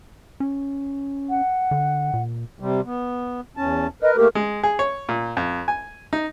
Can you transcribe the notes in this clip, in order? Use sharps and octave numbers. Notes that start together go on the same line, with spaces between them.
C#4
F#5
D3
A#2
C3 G3
B3
E2 C#4 A5
A#4 B4 D#5
A3 A#3 G4 A#4
G#3
G#4
C#5
A#2
F2
G#5
D#4